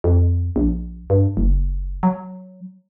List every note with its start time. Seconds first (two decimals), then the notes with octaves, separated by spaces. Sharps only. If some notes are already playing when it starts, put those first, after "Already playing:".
0.04 F2
0.56 A#1
1.10 G2
1.37 F#1
2.03 F#3